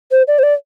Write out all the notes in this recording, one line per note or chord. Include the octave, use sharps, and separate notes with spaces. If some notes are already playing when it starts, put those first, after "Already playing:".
C5
D5
C5
D5